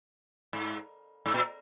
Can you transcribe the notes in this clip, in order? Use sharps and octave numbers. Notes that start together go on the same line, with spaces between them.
G#2
G#2
A#2